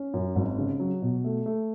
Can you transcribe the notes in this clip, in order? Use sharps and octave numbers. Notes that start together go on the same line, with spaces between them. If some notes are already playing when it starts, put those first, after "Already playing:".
Already playing: C#4
F#2
G#1
C#3
F#3
B2
A3
A3